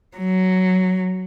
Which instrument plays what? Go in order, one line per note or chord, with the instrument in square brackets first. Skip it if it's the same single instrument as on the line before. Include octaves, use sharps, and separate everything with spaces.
[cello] F#3